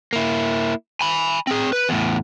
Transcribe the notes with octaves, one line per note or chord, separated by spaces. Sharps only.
A#3 E4
G#5 B5
C4 G#4
B4
E2 A2